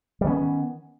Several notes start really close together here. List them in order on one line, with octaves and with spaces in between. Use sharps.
G3 D#3 C#4 B3